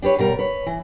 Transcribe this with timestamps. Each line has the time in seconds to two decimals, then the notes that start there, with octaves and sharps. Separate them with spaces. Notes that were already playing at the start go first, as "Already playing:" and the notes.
0.02 D4 G4 B4 C#5
0.18 B2 G3 A#4
0.39 B4 C#5
0.66 E3